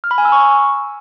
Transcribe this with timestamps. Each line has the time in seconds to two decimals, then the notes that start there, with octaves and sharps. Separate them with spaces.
0.04 F6
0.11 B5
0.18 G#5
0.25 E6
0.32 C#6